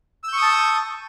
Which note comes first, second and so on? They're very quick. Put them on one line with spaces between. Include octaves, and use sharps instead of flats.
E6 G6 C#6 D#6 A5